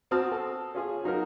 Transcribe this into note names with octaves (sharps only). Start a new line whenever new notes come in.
C4 F#4 A5 D#6 F6
A4
C#4 F4 G#4
F#3 D#4 F#4 A#4